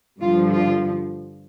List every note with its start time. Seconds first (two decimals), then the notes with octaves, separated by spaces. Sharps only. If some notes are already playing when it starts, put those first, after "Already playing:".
0.20 G2 D3 F3 F4
0.55 F4